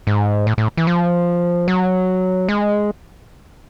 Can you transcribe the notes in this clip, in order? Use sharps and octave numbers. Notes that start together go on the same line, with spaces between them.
G#2
A2
A2
E3
F3
F#3
G#3